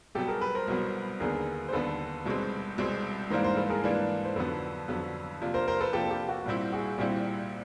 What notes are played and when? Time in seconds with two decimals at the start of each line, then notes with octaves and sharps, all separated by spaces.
0.15 C2 B2 F#3 B3 G4 A4
0.28 G#4 A#4
0.41 A4 B4
0.55 A#4 C5
0.68 C2 B2 F#3 B3
1.20 D#2 D3 G3 B3 G#4 A#4
1.68 C5
1.73 D#2 D3 G3 B3 A4 B4
2.26 C2 B2 G#3 C4
2.78 C2 B2 G#3 C4
3.30 G#2 E3 G3 A#3 D4 A#4 C5
3.44 A#4 C5
3.57 A4 B4
3.70 G#4 A#4
3.83 G#2 E3 G3 A#3 D4 A4 B4
4.25 C5
4.36 F2 D3 F#3 B3 A4 B4
4.88 F2 D3 F#3 B3
5.41 C3 F3 A#3 D4
5.54 A#4 C5
5.68 A#4 C5
5.81 A4 B4
5.93 C3 F3 A#3 D4 G4 A4
6.10 G4
6.29 F#4
6.46 C2 A#2 G3 C4 E4
6.72 F#4 G#4
6.98 C2 A#2 G3 C4 E4 G4